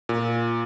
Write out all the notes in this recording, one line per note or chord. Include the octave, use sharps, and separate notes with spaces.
A#2